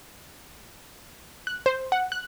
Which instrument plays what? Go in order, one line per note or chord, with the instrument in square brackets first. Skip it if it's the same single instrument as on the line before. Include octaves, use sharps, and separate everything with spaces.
[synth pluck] F#6
C5
F#5
F#6